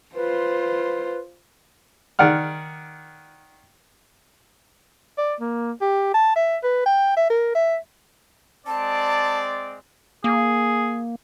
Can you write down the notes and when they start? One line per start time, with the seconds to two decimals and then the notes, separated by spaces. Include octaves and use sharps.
0.15 F4 B4 C5
2.19 D#3 D5 F#5 F6
5.18 D5
5.40 A#3
5.81 G4
6.14 A5
6.36 E5
6.63 B4
6.86 G5
7.17 E5
7.30 A#4
7.55 E5
8.67 G#3 C4 D5 A5
10.24 A#3 G#4